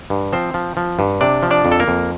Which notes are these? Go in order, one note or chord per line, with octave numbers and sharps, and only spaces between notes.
G2
F3 C4 C5
F3
F3
G2
C3 D4 D5
F3
D4 D5
F2
A4
A#3 A#4
F2